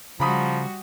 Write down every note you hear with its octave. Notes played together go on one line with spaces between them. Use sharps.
C#3 F3 G3 F#4 A#5 B5 D#6